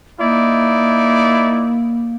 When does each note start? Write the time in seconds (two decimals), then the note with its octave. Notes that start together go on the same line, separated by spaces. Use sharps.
0.21 A#3 D#4 E4 D5